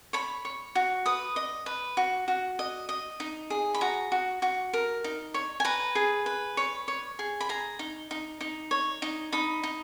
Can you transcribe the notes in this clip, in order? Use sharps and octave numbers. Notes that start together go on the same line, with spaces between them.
C#5 B5
C#5
F#4
B4 D#6
D#5
B4
F#4
F#4
D#5
D#5
D#4
G#4
B5
F#4 A#5
F#4
F#4
A#4
D#4
C#5
G#5
B4 A#5
G#4
B4
C#5
C#5
G#4
B5
G#4 A#5
D#4
D#4
D#4
C#5
D#4
D#4 B5
D#4